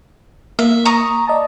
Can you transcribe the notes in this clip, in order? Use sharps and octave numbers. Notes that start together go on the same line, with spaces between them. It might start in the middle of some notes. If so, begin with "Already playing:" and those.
A#3 E5
A#5 C#6 D#6
D5 D#5 A5